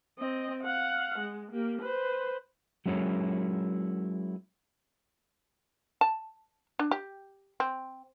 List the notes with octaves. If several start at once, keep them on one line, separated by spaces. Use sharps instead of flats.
C4 D#5
F5 F#5
G#3
A#3 G4
B4 C5
F#3 G#3 C#4 E4 A#4 C#5
A5
D4
G4
C4